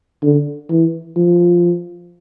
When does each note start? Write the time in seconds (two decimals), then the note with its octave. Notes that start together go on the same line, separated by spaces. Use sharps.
0.23 D3
0.70 E3
1.16 F3